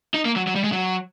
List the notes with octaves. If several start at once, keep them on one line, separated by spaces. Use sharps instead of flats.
D#4
A#3
F#3
F#3
G3
G#3
F#3